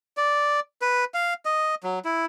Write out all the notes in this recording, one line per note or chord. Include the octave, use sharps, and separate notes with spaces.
D5
B4
F5
D#5
F#3
E4